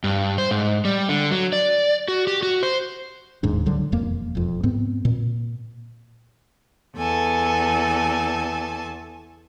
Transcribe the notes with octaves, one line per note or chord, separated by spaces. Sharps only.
G2
C5
G#2
G3
D3
F#3
D5
F#4
G4
F#4
C5
D1 D#2 G#2 D4
C#2 D3 F#3 G3
E1 F2 A#3
E1 F2
G#2 B3 C4
A#2
E2 A4 G#5 A5